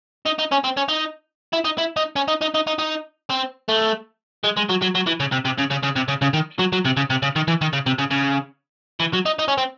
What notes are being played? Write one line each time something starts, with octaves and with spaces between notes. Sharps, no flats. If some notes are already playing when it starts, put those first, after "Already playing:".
D#4
D#4
C#4
C4
C#4
D#4
E4
D#4
E4
D#4
C#4
D#4
D#4
D#4
D#4
D#4
C4
A3
G#3
G#3
F#3
F#3
F#3
E3
C#3
C3
C3
C#3
C#3
C#3
C3
C#3
C#3
D#3
F#3
F#3
C3
C#3
C3
C#3
D#3
E3
D#3
C#3
C3
C#3
C#3
E3
F#3
D#4
D#4
C#4
C4